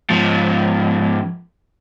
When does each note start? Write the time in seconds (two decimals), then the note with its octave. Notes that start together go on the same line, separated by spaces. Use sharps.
0.10 G#2 F3